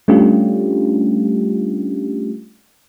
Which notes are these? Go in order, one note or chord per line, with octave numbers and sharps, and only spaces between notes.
G3 A3 C#4 D4 F4 G4